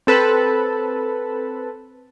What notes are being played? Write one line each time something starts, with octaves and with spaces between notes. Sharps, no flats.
C4 A4 B4